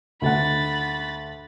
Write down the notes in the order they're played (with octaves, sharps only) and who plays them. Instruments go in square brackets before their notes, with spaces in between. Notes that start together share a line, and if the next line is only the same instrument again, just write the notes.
[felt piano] D2 F#5 [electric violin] B5 A6